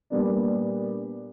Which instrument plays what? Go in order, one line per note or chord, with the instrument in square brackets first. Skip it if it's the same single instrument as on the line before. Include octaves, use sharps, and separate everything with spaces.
[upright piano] A#2 G3 B3 D4